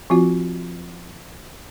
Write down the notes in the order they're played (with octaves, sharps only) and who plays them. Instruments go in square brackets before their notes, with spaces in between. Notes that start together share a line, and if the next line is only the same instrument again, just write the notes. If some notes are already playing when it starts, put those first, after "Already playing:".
[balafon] F3 C4 F4 F#4